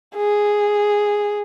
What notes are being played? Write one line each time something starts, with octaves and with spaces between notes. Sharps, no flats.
G#4